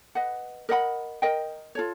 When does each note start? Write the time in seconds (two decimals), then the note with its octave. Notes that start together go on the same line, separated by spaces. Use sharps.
0.15 B4 D#5 F#5
0.69 A#4 D#5 F#5 B5
1.22 A#4 D#5 G5
1.75 F4 A4 C#5